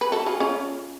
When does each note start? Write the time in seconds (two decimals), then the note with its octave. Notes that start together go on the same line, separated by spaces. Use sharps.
0.01 B4
0.12 F#4 A4
0.26 F4 G#4
0.40 C#4 F4